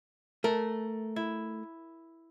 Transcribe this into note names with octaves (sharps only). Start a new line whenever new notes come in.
A3 A#4
E4